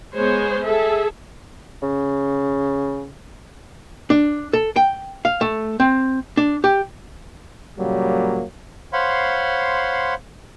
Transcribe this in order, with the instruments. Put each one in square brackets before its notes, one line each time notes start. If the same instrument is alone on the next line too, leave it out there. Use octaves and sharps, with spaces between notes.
[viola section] G#3 B3 C5 C#5
G#4 A4 E5
[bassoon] C#3
[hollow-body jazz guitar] D4
A4
G5
F5
A3
C4
D4
G4
[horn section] A#2 C#3 F#3 G3 A#3
[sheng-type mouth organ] C5 C#5 F5 F#5 B5 C6